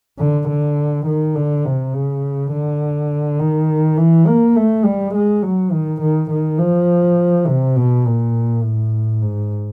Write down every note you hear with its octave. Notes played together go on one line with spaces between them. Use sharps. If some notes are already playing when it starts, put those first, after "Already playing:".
D3
D3
D#3
D3
C3
C#3
D3
D#3
E3
A#3
A3
G3
G#3
F#3
D#3
D#3
D#3
F3
C3
B2
A#2
A2
G#2